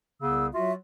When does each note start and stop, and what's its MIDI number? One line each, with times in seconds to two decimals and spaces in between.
0.22 0.48 36
0.22 0.48 49
0.22 0.48 59
0.22 0.48 88
0.54 0.73 54
0.54 0.73 65
0.54 0.73 66
0.54 0.73 76